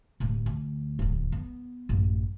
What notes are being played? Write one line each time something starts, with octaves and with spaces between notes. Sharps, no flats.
D1 A1
D2
D1 E2
B3
A1 F#2